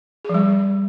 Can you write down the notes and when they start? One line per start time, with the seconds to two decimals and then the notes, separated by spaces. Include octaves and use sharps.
0.25 G#4
0.29 F3
0.34 G3